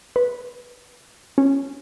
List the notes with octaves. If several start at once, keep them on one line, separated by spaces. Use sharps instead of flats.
B4
C#4